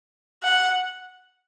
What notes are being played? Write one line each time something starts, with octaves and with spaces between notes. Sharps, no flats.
F#5